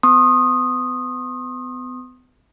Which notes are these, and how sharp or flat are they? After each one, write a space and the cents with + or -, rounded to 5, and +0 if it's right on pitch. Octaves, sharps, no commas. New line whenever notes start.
B3 +35 C6 +40 D#6 -5